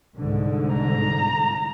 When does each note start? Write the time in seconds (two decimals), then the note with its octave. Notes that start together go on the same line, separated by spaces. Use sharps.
0.18 C2 G#2 D3
0.74 A#5